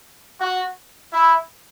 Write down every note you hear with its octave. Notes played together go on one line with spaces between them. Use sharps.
F#4
E4